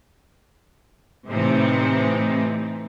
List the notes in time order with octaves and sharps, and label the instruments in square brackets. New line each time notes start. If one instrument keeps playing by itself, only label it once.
[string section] A2 C3 E3 C4 D#4